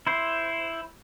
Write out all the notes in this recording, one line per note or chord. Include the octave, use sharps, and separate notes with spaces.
E4 C5